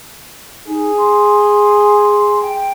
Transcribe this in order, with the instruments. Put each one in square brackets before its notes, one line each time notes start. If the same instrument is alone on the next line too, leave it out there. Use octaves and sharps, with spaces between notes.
[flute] D#4 [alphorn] G#4
[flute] C6
G5